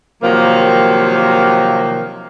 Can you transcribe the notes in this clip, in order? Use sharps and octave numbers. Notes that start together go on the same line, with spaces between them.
C3 D#3 F3 F#3 A#3